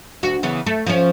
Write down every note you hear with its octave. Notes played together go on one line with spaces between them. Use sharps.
D2 F#4
C#3 E3 B3
A3
F3 C#4